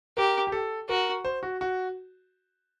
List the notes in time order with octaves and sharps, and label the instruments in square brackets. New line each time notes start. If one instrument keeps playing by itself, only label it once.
[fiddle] G4 [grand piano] A#4
[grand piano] G4
A4
[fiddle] F#4 [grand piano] A#4
[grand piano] C5
F#4
F#4